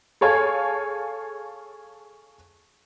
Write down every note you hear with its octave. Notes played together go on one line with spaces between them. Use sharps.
G#4 A4 C#5 F5 G#5